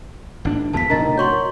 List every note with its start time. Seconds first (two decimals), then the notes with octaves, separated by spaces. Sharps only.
0.45 G#1 D4
0.73 F1 E2 B3 A5 B6
0.90 A2 C3 D#3 D4 A#5 A6
1.18 F#3 C6 C#6 G6